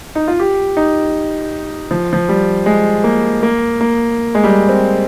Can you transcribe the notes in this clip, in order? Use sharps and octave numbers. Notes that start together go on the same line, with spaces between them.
D#4
F4
G4
D#4
F3
F3
G3
G#3
A#3
A#3
A#3
G#3
G3
C4